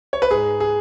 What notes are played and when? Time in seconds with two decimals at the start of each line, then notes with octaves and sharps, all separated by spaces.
0.13 C#5
0.22 B4
0.31 G#2 G#4
0.60 G#4